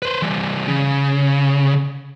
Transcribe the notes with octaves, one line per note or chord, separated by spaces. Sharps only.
B4 C5
E3 G3
C#3